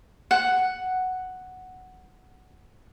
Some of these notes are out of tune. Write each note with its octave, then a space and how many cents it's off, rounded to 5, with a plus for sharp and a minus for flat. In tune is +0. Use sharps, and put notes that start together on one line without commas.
F#5 +5